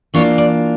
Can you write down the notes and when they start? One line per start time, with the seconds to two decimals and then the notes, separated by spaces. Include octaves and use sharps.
0.14 E3 A#3 D4 F4 C#5
0.38 D5